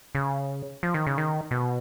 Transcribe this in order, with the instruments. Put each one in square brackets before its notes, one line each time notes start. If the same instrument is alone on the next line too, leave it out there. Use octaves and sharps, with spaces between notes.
[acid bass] C#3
F3
D#3
C#3
D#3
B2